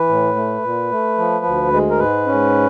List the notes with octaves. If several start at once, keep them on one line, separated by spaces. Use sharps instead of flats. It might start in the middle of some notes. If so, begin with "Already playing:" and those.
Already playing: E3 B4
A2
A3
A#2
A3
F3
D2
G#3
A#4
G#2 B4
C#4